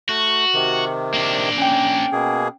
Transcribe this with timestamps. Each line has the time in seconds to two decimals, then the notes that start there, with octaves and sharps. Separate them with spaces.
0.09 A3 F#4
0.54 C3 D#3
1.14 A#3 D4
1.58 C#4 G5
2.12 B2 A#3 G#4